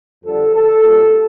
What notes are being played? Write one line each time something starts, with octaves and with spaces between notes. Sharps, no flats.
F2 D3 G3 A4
A4
A#2 G3 A4